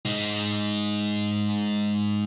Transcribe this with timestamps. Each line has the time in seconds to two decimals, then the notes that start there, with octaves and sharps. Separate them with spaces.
0.05 G#3 D#4